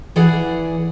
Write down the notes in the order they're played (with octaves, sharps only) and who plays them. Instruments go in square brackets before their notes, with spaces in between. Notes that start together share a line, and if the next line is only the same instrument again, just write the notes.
[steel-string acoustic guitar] E3 E4 G#4 D5 F#5